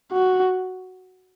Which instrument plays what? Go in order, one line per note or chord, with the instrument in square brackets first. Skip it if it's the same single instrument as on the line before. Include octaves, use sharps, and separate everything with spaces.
[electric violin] F#4